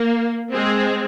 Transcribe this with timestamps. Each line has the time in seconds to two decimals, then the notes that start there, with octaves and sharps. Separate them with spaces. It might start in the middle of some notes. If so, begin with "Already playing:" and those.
Already playing: A#3
0.52 G#3 C4